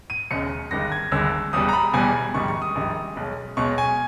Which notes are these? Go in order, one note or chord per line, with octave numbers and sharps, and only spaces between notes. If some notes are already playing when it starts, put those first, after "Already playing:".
D#7
E1 D#2 C#3 G#3 C#7
G1 G2 D#3 G#3 A#6
G#6
G1 G2 D#3 G#3 E6
E1 E2 B2 G3 D#6
A#5
B5
E1 E2 B2 G3 G#5
A#1 G#2 D#3 G3 C#6
C#6
D#6
A#1 G#2 D#3 G3
B1 B2 G#3
B1 B2 G#3 C#6
G#5